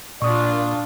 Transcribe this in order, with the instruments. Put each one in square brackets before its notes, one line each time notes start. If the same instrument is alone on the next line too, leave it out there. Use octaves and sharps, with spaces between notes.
[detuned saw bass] A#2 [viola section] D4 F4 [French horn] D5 [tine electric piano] C#6 D#6